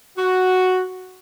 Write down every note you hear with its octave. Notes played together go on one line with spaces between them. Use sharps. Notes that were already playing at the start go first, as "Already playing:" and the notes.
F#4